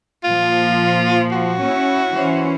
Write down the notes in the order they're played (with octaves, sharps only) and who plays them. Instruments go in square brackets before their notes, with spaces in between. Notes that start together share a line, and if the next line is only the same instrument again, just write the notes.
[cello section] A#2 F3 [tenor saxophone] F4
[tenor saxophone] F#4
[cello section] C#4 E4
E3 C#4 C5